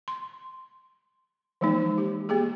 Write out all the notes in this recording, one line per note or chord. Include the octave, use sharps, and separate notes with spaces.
C6
E3 F3 G#3 A#3 D#4
G4
A#3 G4 G#4